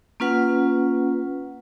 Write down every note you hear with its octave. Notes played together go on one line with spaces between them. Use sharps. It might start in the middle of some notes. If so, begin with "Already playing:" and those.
A#3 C#4 F4 B4 F#5